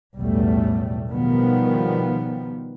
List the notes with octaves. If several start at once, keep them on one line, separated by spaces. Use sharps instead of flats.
B1 E2 A2 G3 A3
B2 D#3 F3 G3 B3